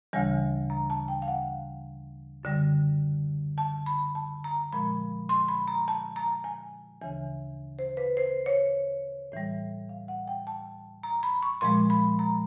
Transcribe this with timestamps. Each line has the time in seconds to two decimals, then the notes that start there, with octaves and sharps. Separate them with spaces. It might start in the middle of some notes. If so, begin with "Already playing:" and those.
0.13 D2 C#3 E3 G3 G#5
0.70 A#5
0.90 A5
1.08 G5
1.22 F5
1.28 F#5
2.43 F#2 D3 G3
3.58 A5
3.86 B5
4.15 A5
4.44 A#5
4.73 A#2 F3 G#3 B5
5.29 C6
5.48 B5
5.68 A#5
5.88 A5
6.16 A#5
6.44 G#5
7.02 D2 C#3 E3 G#5
7.79 C5
7.97 B4
8.17 C5
8.46 C#5
9.32 A2 E3 G3
9.89 F5
10.08 F#5
10.28 G5
10.47 A5
11.03 A#5
11.23 B5
11.43 C#6
11.61 A#2 F3 G#3 C6
11.90 B5
12.19 A#5